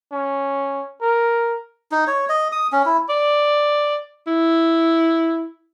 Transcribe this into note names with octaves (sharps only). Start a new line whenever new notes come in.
C#4
A#4
D#4
C#5
D#5
D#6
C#4
E4
D5
E4